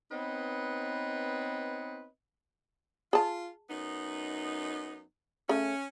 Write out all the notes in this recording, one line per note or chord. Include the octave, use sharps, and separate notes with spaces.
B3 C4 D#4 B4 C#5 D#5
F4 G#4 A5
F#2 B3 D#4
C#3 A3 C#4